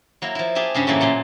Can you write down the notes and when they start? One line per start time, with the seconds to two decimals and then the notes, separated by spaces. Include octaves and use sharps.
0.22 F#3 A#3 E4
0.35 F3 E4
0.55 G4 G#4 E5 G#5 A5
0.74 G2 C#3 C#4
0.87 A2 C#3 E3 F#3 A3 A#3
1.01 A#2 F#3 A5 C6